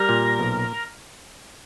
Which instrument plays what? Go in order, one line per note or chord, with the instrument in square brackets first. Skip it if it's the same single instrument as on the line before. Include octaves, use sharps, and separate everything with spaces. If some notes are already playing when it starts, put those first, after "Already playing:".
Already playing: [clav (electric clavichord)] G3 [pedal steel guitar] A#4
[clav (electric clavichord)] A#2
B1